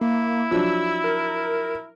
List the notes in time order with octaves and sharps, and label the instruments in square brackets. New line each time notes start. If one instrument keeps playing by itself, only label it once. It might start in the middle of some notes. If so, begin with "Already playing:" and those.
[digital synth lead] A#3 [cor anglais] E4
[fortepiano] F3 F#3 D4 [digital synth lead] E6
[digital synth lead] A#4